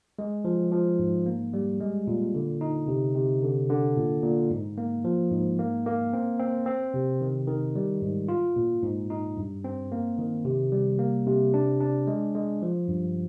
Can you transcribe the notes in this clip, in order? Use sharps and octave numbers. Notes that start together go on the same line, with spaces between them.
G#3
F3
F3
G#2
A#3
G3
G#3
A#2
D3
D#4
C3
C3
D3
D3
A#2
A#2
G#2
A#3
F3
G#2
A#3
A#3
C4
C4
C4
C3
D#3
D#3
G3
G#2
F4
A#2
G#2
D#4
G2
C4
A#3
D#3
C3
G3
A#3
C3
D4
D4
G#3
G#3
F3
G2